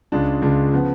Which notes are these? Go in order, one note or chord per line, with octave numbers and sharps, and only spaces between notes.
C#2 C#3 G#3 D4 F4
C#2 C#3 G#3 D4 F4
C#3 F3 B3